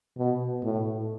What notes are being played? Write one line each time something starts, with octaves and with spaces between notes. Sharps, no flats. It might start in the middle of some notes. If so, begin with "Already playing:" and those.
B2
A2